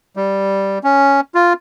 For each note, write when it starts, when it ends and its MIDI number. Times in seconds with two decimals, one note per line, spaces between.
0.16 0.79 55
0.84 1.21 61
1.35 1.53 65